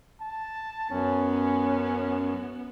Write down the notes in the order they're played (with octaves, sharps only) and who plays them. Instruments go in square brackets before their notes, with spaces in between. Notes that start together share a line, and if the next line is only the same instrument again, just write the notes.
[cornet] A5
[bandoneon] F#2 [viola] B3 [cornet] C#4